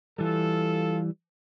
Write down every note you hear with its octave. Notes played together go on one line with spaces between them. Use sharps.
E3 G3 F4 A4